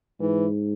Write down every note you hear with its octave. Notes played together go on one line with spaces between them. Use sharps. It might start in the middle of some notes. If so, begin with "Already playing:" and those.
G#2 E3